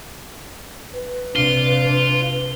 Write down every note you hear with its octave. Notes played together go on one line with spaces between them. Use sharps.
B4
C3 D4 F4 G7